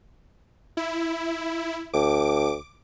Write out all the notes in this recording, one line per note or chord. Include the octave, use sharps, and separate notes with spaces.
E4
D2 D6